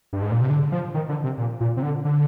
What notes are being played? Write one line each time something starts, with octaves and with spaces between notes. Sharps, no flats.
G2
G#2
A#2
C3
D3
F3
D#3
D3
C3
A#2
A#2
C3
D3
D3